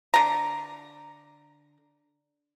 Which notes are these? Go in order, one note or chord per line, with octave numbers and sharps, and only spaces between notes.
D3 A#5